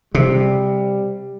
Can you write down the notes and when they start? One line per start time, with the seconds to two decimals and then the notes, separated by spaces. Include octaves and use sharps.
0.15 C3 G3